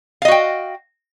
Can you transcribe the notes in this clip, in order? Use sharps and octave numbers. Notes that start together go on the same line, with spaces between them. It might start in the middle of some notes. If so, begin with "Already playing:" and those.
F#4 D#5 F5 G5